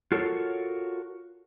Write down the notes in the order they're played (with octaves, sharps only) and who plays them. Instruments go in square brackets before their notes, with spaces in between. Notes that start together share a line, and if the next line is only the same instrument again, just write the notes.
[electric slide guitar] F4 F#4 A4 A#4 C#5